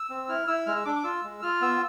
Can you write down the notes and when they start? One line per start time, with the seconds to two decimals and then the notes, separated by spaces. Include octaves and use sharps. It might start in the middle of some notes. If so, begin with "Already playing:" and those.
Already playing: E6
0.10 C4
0.29 E4 F6
0.47 E4 E6
0.66 G#3 F6
0.75 E6
0.85 D4 D6
0.95 D6
1.04 F4 E6
1.24 G#3
1.42 F4 F6
1.61 B3 E6